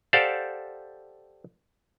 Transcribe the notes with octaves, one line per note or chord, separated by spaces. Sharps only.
G4 A4 C5 D5 F5 F#5